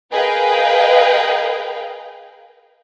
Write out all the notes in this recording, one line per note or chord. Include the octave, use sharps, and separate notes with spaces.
G#4 A#4 B4 D#5 F5 G5